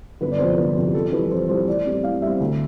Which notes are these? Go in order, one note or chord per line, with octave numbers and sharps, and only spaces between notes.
G1 B4
D5
F2 C3 C5
G1 B4
F2 C3
G4
F2 A4
E3 G3 B4
F2 C5
E3 G3 C5
A2 D5
G3 C4
A2 F5
G3 C4 E5
D2